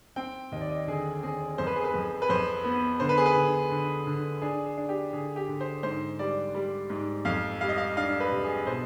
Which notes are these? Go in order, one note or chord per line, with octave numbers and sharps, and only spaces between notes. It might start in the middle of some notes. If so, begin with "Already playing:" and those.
C4 G5
D#2 D#5
D5
D#5
D3 G#4
C4 G#4
F2 C5
B4
G#4
B4
F2
B4
F2 C5
B3
D3 C5
B4
G#4
B4
D3
D3
D3
D4 G#4
G#4
D4
G4
D3 G#4
G4
D3
C5
G#2 C5
G3 D5
G3
G#2
F2 F5
G3 F5
D#5
F5
D4 F5
B4
C3
G#4
B2 C5